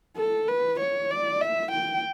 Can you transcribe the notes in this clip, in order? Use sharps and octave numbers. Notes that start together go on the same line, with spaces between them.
A4
B4
C#5
D5
E5
G5